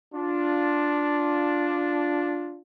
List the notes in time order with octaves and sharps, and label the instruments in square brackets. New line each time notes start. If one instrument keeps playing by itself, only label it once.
[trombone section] D4 F4